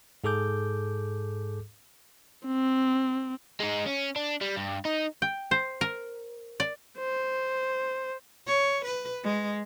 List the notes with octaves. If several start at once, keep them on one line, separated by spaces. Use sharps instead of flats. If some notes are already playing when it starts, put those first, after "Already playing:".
G#2 G#4 A4 D6 G6
C4
G#3 D#4
C#4
D4
G3
G2
D#4
G5
C5
A#4
D5
C5
C#5
B4
G#3